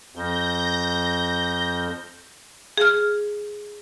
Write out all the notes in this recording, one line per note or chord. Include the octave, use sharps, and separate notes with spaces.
F2 G6 A#6
G#4 F6